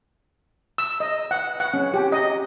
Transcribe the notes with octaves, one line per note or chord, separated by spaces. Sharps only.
E6
D#5
F#5
F#5
C#4
G4
D#5